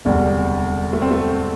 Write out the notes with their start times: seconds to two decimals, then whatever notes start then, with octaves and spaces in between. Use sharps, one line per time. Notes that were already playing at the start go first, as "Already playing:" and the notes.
0.05 E1 D2 C3 G3
0.93 A3
1.02 C4
1.11 A3